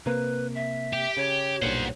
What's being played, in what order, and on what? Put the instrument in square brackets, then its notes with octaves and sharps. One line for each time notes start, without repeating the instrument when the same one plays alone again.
[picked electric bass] C3 A#3 [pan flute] B4
[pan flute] E5
[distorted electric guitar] G4
[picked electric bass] C#3 [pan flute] C#5
[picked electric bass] B1 G2 A#2 [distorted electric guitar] C5 F#5